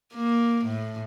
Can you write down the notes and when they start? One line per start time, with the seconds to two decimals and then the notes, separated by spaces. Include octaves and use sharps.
0.14 A#3
0.65 A2